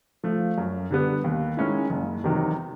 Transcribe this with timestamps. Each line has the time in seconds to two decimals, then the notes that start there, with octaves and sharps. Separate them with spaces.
0.24 F3 A3
0.58 F#2
0.91 D3 G3 B3
1.24 D#2
1.57 D#3 G#3 C#4 E4
1.90 F#1
2.24 E2 C3 D#3 F#3